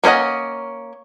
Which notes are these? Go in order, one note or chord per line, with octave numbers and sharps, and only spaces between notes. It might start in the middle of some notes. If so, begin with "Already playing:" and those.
A#3 C#4 C5 D#5 F#5